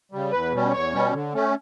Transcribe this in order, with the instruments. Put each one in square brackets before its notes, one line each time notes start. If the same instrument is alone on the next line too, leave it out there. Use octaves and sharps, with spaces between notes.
[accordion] C#3 G3
[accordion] E2 [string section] B4
[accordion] B2 G3 C#4
[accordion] E2 [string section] C#5
[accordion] B2 G3 C#4
D3
A3 C#4